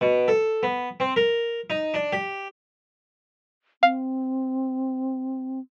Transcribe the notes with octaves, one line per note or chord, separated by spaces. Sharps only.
B2
A4
B3
C4
A#4
D#4
D4
G4
C4 F5